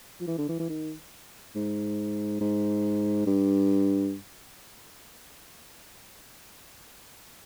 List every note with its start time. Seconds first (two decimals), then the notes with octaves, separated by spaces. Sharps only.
0.21 F3
0.27 E3
0.38 D3
0.48 E3
0.60 E3
0.70 D#3
1.55 G#2
2.41 G#2
3.26 G2